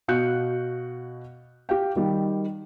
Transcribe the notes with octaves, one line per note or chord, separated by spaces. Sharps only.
B2 F#4 F5 F#6 G6 C#7
G4 F5 G5
D#3 G3